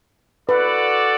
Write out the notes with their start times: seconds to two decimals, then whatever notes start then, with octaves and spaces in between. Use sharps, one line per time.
0.49 F#4 A4 B4 D5 F#5